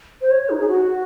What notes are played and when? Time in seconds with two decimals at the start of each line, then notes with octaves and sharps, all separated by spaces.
0.21 C5
0.31 C#5
0.50 D#4
0.60 G#4
0.68 F#4